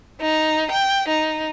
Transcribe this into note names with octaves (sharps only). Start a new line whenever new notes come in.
D#4
G5
D#4